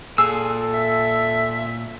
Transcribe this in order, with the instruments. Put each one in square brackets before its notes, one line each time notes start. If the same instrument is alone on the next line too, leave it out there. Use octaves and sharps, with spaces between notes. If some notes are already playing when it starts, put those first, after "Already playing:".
[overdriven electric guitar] A#2 [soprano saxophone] G#4 [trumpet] A4 [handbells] E6
[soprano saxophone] E5